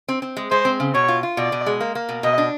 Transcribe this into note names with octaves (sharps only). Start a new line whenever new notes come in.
C4
C4
G#3
G#3 C5
C4
C#3
B2 C#5
F4
F4
B2 D5
B2
G#3
A#3
A#3
B2
B2 D#5
D4